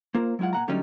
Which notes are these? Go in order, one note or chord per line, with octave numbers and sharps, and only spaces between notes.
A#3 F4 A#4 C5
F#3 G#3 E4 F4 F#5
A#2 F#5 A#5
D3 F#3 G3 A3 C#4 D#4